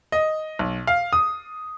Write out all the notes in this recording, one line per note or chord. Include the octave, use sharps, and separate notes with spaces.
D#5
B1
F5
D#6